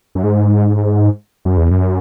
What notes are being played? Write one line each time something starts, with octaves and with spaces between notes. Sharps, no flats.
F#2
G#2
F#2
E2
F#2